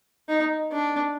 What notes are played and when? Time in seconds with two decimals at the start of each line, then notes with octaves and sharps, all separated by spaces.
0.29 D#4
0.72 D4